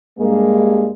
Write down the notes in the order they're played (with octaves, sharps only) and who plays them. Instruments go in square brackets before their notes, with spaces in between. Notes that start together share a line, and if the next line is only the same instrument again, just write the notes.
[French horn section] G2 G#3 A#3